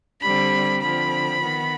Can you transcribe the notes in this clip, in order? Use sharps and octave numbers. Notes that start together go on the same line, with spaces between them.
D3 G3 C4 B5
D3 F3 C4 B5
D#3 B3